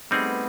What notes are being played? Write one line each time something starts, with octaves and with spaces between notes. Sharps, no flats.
G3 A3 B3 C4 D#4 G#4